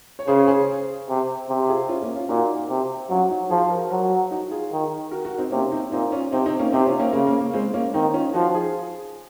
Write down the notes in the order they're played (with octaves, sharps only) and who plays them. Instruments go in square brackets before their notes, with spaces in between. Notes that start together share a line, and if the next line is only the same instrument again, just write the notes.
[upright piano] C#5
[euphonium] C#3 [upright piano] G#4 C5
[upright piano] G#4 C5
[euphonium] C3
C3
[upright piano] F4 G#4
C#4 F4
A#3 C#4
C#4 F4
[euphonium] A#2 [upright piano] D#4 F#4
[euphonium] C3
[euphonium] F#3 [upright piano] C#4 F4
[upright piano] D#4 F#4
[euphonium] F3 [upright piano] F4 G#4
[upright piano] C5
F#4 A#4
[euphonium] F#3 [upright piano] F#4 A#4
[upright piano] D#4 F#4
F4 G#4
[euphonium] D#3
[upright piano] F#4 A#4
F#4 A#4
C4 D#4
[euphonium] C3 [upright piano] A#3 C#4
[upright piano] C4 D#4
[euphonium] A#2 [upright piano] C4 D#4
[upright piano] C#4 F4
[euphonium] C3 [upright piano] C4 D#4
[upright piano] C4 D#4
A#3 C#4
[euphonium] C3 [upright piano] C4 D#4
[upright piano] C#4 F4
A#3 C#4
[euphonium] C#3 [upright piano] A#3
[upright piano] A#3
A#3
G#3 C4
A#3 C#4
[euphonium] D#3 [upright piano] C4 D#4
[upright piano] C#4 F4
[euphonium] F3 [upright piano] D#4 F#4
[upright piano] F4 G#4